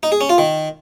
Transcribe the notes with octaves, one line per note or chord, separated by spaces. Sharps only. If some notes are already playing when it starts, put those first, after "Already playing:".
D#4
G#4
C#4
F4
D#3